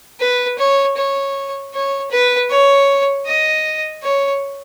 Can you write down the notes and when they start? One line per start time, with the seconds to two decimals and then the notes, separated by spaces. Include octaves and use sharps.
0.20 B4
0.58 C#5
0.97 C#5
1.74 C#5
2.11 B4
2.50 C#5
3.26 D#5
4.03 C#5